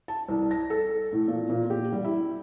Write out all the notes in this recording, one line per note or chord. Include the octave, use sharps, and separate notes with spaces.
A5
C2
A#6
A4
A2
A#2
A#2
G4
G3
E4